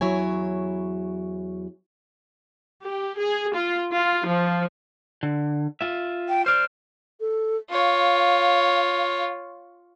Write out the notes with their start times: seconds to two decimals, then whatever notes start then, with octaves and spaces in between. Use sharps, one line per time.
0.01 E2 F#3 E4 C#5 G#5
2.85 G4
3.21 G#4
3.56 F4
3.94 F4
4.27 F3
5.23 D3
5.81 F4 E5
6.29 G5
6.46 C5 D5 F6
7.20 A4
7.70 F4 C#5 F5